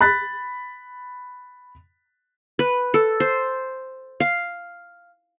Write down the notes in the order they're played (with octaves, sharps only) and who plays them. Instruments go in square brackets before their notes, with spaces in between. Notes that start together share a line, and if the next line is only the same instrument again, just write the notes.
[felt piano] B5 F#6 A6 B6
[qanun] B4
A4
C5
F5